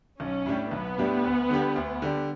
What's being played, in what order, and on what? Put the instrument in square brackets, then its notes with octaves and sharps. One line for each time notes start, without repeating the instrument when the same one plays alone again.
[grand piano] B1 [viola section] C#4
[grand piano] A2 G3 D4 G4
[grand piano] B1 [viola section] B3
[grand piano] A2 G3 D4 G4
D2
D3 G3 D4 G4
D2
D3 G3 D4 G4